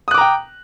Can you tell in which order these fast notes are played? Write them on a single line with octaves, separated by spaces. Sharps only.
D#6 F#6 D6 A#5 G5